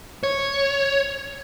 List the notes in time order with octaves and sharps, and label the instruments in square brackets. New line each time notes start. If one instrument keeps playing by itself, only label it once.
[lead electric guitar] C#5